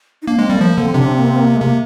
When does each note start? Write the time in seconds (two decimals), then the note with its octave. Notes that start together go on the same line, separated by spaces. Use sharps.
0.22 D#4
0.27 A#3 D4
0.38 G#3 C4
0.49 G3 A#3
0.57 G#3
0.61 F3 A#3
0.72 A#3
0.78 D3
0.83 C4
0.94 C3 D4
1.05 C4
1.17 A#3
1.26 C4
1.36 A#3
1.56 G#3
1.61 C3 A#3